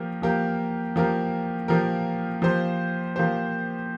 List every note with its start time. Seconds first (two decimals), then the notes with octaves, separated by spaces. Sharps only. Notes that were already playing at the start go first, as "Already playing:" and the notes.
Already playing: F3 A#3 G4 A#4
0.22 F3 A#3 G4 A#4
0.96 F3 A#3 G4 A#4
1.68 F3 A#3 G4 A#4
2.42 F3 A#3 G4 C5
3.16 F3 A#3 G4 C5